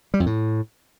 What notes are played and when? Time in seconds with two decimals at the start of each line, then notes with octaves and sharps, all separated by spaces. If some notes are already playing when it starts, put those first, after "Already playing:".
0.14 G3
0.20 F2
0.26 A2